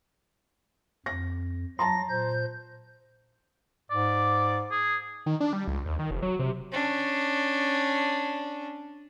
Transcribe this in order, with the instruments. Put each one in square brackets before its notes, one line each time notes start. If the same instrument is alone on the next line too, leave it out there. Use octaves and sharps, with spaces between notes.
[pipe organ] F2 [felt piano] A#6
[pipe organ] F#3 A#6 [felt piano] A5 A#5 C6
[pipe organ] A#2 C5 G6
[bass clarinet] G#2 [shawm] D5
[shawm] G#4
[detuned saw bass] D#3
D4
G3
C#2
D#2
D#3
F1
F#3
C3
[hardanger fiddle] C#4 D4